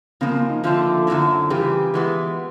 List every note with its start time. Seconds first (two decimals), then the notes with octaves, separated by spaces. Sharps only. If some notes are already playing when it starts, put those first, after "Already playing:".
0.21 C#3 F3 G#3 A#3
0.35 A#3
0.49 D#4
0.64 D3 F3 A3 C4 F4
1.07 F#2 D3 G3 C4 E4
1.50 C#3 E3 G3 G4
1.94 E3 G#3 B3